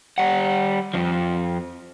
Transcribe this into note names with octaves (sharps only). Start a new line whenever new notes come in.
G3 F#5
F2 F3